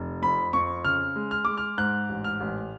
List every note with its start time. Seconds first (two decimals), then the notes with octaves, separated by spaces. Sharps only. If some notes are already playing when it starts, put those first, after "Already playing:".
Already playing: F1
0.22 F2 B5
0.53 F2 C#6
0.84 C#3 F6
1.16 G#3
1.31 F6
1.45 G#3 D6
1.57 F6
1.78 G#2 F#6
2.09 A1
2.24 F6
2.40 A1